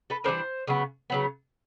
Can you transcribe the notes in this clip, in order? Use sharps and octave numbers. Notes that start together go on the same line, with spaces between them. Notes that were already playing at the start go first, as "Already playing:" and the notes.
A4 B4
E3 G3 B3 D4 A#4 C5
C#3 F#3 B3
C#3 F#3 B3